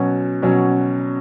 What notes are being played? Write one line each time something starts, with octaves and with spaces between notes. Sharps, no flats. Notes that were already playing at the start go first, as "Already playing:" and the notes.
Already playing: B2 F#3 C#4
B2 F#3 C#4